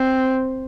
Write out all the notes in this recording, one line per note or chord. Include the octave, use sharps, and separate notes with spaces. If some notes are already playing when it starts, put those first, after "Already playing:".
Already playing: C4